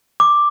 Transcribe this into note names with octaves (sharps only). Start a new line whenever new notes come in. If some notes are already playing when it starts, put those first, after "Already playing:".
D6